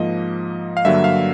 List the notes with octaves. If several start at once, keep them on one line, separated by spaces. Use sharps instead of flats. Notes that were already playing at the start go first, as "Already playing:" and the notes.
Already playing: G#2 F3 A#3 D#5
F5
G2 D3 F#3 A#3 E5
F5